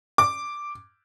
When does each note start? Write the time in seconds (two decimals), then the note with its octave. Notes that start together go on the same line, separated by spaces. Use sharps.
0.18 D6